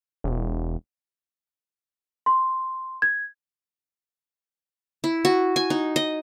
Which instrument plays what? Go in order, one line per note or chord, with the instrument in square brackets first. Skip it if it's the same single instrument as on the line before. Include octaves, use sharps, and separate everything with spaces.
[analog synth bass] E1
[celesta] C6
G#6
[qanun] E4
F#4
G#5
D#4
D#5